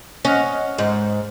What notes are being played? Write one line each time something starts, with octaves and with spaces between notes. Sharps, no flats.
C#4 D#5 F#5 F6
G#2